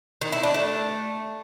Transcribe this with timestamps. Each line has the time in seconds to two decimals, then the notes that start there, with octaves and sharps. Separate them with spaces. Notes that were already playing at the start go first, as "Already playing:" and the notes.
0.21 D#3
0.32 E4
0.43 D4
0.54 A3